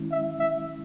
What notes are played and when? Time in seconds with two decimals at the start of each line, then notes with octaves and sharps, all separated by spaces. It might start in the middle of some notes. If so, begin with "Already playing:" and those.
Already playing: D#3 G#3 C#4 E4
0.11 E5
0.40 E5